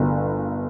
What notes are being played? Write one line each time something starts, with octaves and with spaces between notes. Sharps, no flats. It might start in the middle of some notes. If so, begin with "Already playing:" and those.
Already playing: G1 G2